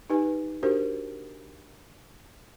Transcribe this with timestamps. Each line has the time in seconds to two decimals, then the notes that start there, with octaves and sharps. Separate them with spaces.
0.10 D#4 G4 B4 G#5
0.63 D4 F#4 G4 A#4 C5